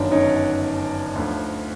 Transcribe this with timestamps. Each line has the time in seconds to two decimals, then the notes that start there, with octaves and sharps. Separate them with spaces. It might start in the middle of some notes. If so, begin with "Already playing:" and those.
Already playing: G1 F#2 D#3 F#3 D4
0.11 C#4 D#4
1.15 D2 D3 F3